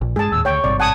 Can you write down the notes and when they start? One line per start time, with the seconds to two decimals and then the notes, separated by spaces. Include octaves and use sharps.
0.01 A#1
0.16 G2 G#3 G#4 A5
0.32 D#2 A2 E6
0.45 D2 C#5 G5 C#6
0.64 G#1 G2 C3 D5
0.80 F#5 G#5 A5 D#6